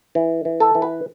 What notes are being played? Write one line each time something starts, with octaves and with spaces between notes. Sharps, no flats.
E3
E3
A4
E3
B4